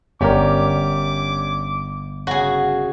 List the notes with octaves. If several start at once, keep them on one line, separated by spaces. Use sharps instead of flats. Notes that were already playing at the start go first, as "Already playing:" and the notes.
G1 C#4 G4 A#4 D5 D6
C#3 F#4 G#4